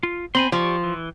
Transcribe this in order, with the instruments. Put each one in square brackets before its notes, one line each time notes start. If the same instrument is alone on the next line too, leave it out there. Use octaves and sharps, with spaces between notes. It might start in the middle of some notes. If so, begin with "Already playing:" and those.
[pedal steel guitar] F4
[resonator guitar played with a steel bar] C4 [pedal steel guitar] G#5 B5 C6
[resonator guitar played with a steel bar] F3 [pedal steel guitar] G4 D5 C#6
[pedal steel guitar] E3